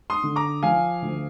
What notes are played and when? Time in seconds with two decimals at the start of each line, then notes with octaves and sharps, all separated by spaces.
0.10 C6 D#6
0.23 D3
0.36 A#5 D6
0.63 F3 F5 G#5
1.02 D2